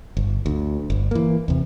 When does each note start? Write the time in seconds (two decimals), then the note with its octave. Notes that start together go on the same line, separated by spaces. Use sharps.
0.17 G1
0.46 D2
0.90 G1
1.11 E3 A#3
1.48 E2 C3